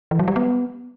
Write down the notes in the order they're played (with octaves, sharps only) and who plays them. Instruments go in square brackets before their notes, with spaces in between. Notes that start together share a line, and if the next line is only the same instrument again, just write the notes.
[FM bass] E3
F#3
G3
B3